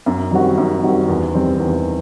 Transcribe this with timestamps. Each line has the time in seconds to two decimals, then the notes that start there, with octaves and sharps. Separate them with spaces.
0.06 F#2
0.31 D#3 G3 C4 F#4
0.58 F#2
0.83 D#3 G3 C4 F#4
1.08 E2
1.34 D#3 G3 C4
1.60 E2